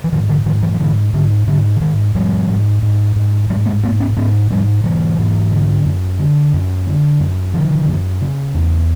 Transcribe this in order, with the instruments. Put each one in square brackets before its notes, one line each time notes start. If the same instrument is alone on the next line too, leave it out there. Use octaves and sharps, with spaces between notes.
[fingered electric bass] E3
G#2 D#3 F3
D3 E3
G#2 D#3 F3
E3 F#3
F3
G#2 D3 E3
G#2 D3
G#2 D3
D3
G#2 D#3
G#2 F3 G3
G#2
G#2
G#2
G#2 F#3 G#3
G#3 A#3
G#2 A3 B3
B3 C#4
G#2 B3 C#4
G#2 F3 G3
G#2 E3 F#3
G#2
D3
F#2
D3
F#2
D3
F#2
D3 D#3 F3
F#2
C#3
E2